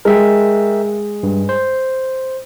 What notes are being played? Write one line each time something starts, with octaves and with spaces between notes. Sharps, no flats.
G#3 A#4 E5 G5
G2
C5